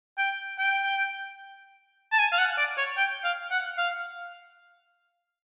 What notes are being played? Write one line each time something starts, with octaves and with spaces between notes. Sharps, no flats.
G5
G5
A5
G#5
F5
F#5
D5
C#5
G5
F5
F#5
F5